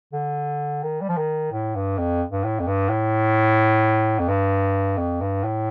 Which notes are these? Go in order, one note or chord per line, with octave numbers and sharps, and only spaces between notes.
D3
D#3
G3
F3
D#3
A2
G2
F2
G2
A2
F2
G2
A2
F2
G2
F2
G2
A2